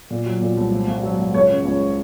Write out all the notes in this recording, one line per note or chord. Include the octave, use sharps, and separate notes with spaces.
A#2
F#3
A#2
C2
G#1
G#1
F#3
G#1
C#2 C#5
C#3
C#2